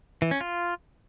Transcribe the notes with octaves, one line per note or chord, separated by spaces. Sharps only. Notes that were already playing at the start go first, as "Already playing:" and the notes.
E3
C#4
F4